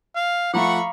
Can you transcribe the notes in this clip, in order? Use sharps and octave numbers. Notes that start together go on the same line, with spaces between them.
F5
F3 A3 F5 F#5 A#5 B5 C#6 D6